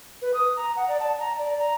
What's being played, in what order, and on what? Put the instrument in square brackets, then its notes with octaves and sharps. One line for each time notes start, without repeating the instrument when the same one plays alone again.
[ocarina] B4
D#6
A#5
F#5
D5
A5
A#5
D5
A#5